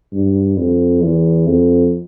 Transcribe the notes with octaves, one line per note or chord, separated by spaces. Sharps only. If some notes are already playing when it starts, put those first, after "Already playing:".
G2
F2
E2
F2